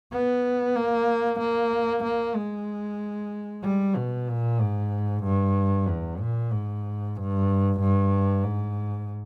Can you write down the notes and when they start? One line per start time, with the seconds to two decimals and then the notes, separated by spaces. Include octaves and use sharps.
0.12 B3
0.76 A#3
1.39 A#3
2.03 A#3
2.36 G#3
3.63 G3
3.96 B2
4.28 A#2
4.60 G#2
5.24 G2
5.88 E2
6.21 A#2
6.52 G#2
7.17 G2
7.80 G2
8.44 G#2